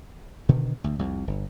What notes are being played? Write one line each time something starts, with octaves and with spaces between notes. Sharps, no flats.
B2 D3 D#3
D2
C2 F2
G1